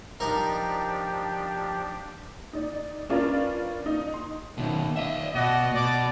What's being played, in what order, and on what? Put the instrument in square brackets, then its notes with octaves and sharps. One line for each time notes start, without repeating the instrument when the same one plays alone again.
[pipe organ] F3 D4 G4 [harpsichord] D#4 A#4
[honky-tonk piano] D#4 D5
C#4 D4 F4 A#4 B4 D5
D#4
C6
[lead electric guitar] B2 D#3
D#5 E5
[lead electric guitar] B2 [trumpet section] F#4 D5 D#5
[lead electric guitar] B2 [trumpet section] D5